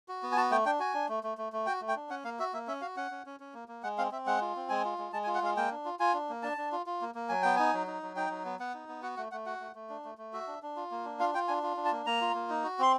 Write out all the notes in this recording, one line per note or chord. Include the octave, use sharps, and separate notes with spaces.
F#4
B3
G#5
F#4 A5
A3 G5
D4 G5
F#4 G#5
D4
A3
A3
A3
A3
F#4 G5
A3
G5
D4
C#4 F#5
A#3 F5
F#4 E5
A#3 E5
C#4 E5
F#4 F5
C#4 F#5
C#4
C#4
C#4
A#3
A#3
G#3 F#5
C4 F5
C4 E5
G#3 F#5
F4
C4
G#3 G#5
F4
G#3
G#3 A5
G#5
F4
F#5
G#3 F5
A#3 G5
D4
F4
F4 G#5
D4
A#3
D4 A5
D4
F4
F4
A#3
A#3
F#3 G#5
B3 G5
D#4 G#5
F#3
D#4
F#3
D#4 G5
F#3
B3
B3 F#5
D#4
B3
F#4 F#5
A3 F#5
A3 F#5
F#4 F#5
A3
A3
D4
A3
A3
F#4 E5
D4
D4
F4
A#3
D4
F4 F5
F4 G5
D4 G#5
F4
D4
A5
A#3
A#3 A#5
F4
A#3
D#4
F#4
C4 C6